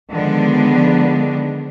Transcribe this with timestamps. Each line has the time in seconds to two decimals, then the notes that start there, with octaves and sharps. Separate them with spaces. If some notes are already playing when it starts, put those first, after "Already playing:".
0.11 D3 D#3 F3 G#3 B3 D4